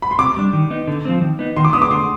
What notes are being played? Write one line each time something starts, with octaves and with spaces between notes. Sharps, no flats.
B5
C6
C3 D6
G3 D4
D#3
B3 D#4
D3
F3 C4
D#3
B3 D#4
D#3 C6
D6
B3 D4 D#6
D6
D3 C6